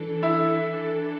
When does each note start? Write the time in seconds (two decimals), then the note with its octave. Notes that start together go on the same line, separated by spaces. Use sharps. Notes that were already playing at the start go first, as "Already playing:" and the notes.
Already playing: E3 D4 A4
0.23 E4